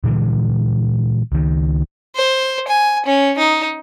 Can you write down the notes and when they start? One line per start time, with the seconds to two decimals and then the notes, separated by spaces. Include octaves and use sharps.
0.04 A#2 D3 E3 G#3
1.32 C#2 D#3
2.16 C5
2.68 G#5
3.06 C#4
3.38 D#4